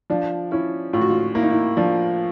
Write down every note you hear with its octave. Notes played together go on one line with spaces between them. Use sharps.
F3 D4
C#4 E4
A2 F4
F#4
F4
A#3 E4
D#4
E4
F3 D4